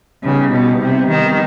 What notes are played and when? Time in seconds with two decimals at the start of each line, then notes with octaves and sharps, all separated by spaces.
0.24 C#3 G3 B3 D#4 G4
0.53 B2
0.80 C3
1.10 D#3